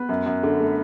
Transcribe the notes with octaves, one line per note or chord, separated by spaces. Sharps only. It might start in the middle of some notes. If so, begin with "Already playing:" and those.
Already playing: B3 B4
F#2
F#2
D3
A3